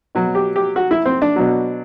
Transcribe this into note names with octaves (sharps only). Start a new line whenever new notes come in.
B2 F#3
G4
G4
F#4
E4
C4
D4
B2 F#3